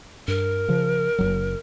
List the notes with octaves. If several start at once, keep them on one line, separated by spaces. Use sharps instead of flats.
G2 A#4
C#3 F3
F#1 C#2 F#3